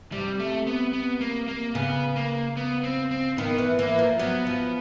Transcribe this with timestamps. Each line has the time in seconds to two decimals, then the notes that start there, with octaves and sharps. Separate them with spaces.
0.12 C3 G3
0.40 A3
0.67 B3
0.93 B3
1.21 A#3
1.48 A#3
1.75 C#3 B3
2.16 A#3
2.57 B3
2.83 C4
3.11 C4
3.38 D#3 B3
3.58 E3
3.79 E3 A#3
3.99 F3
4.19 F#3 B3
4.47 F3